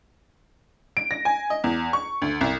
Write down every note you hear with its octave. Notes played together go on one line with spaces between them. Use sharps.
D7
A#6
G#5
D#5
E2
C#6
D2
C2